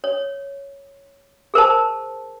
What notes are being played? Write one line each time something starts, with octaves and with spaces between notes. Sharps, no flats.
C#5
G#4 A#4 C5 A5